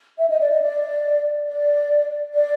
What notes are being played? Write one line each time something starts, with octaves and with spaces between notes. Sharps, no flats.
E5
D#5
D5
D#5
D5
D5
D5